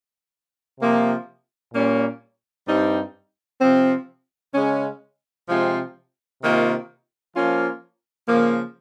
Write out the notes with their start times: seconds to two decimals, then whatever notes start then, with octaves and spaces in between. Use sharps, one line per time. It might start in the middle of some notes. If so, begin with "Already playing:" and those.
0.80 C3 F3 A#3 F4
1.74 A#2 G3 A#3 C#4
2.66 G2 G3 C4 D#4
3.61 C3 F3 C4
4.54 C#3 G#3 C#4
5.48 C3 F3 G#3 C4 F4
6.42 C3 D#3 A#3 F4
7.35 F3 A#3 C#4 F4
8.28 C#3 F3 A#3